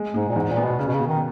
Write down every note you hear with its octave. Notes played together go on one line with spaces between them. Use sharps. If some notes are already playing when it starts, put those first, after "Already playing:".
Already playing: G#3
G#2 G#3
A#2
E2 G#2
A#2
B3
B2
C#3 C#4
B2
C#3
B2
D#3